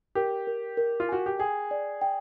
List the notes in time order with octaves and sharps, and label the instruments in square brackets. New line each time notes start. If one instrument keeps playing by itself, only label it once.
[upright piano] G4 [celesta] A#4
[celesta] A#4
A#4
[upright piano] F4
[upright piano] F#4 [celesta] G#5
[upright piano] G4
[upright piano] G#4 [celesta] G5
[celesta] D5
G5